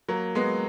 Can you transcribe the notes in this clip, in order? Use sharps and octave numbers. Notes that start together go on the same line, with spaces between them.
F#3 A#3
G#3 B3